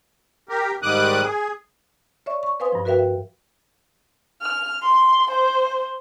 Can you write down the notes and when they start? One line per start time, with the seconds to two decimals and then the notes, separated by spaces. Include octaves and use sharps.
0.49 G4 A#4
0.82 G#2 D#3 G3 D6 D#6 F#6
1.24 G#4
2.26 C#5 D5 E5 C#6
2.43 C#6
2.60 B4 C5 F5 G#5 C6 D#6
2.72 G2 F3
2.85 F#4 A#4 B4 E5 F5 G5
2.99 E5
4.41 F6
4.82 C6
5.31 C5